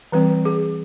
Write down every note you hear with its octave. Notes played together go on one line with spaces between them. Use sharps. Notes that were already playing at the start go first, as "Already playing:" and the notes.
E3 G3 C4 B4
G#4